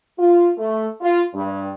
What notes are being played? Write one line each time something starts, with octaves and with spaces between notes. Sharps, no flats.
F4
A3
F4
G2